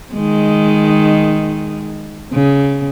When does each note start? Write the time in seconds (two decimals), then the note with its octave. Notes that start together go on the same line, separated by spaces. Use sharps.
0.14 D#3 G#3
2.32 C#3